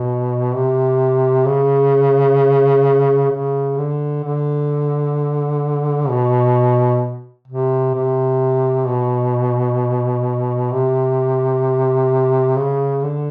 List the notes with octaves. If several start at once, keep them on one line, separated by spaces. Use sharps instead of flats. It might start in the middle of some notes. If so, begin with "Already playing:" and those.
Already playing: B2
C3
C#3
C#3
D3
D3
B2
C3
C3
B2
C3
C#3
D3